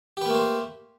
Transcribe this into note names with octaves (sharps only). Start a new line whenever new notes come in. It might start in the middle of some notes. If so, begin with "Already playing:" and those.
A3 A#3 G4 B4 C5